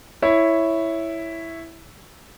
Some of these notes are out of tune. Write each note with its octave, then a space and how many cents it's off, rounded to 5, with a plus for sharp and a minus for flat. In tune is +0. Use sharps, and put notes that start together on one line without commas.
E4 +0 C#5 +0